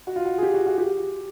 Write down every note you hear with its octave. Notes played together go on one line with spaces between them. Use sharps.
F#4
F4
F#4
G#4
G4
F#4
F#4
G4